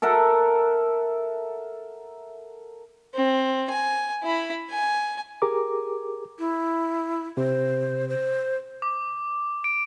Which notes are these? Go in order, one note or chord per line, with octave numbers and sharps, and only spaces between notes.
A4 A#4 E5 F#5
C4
G#5
E4 B5
G#5
G4 G#4 A#4 A#5 D6
E4
C3 C5
C5
D6
D7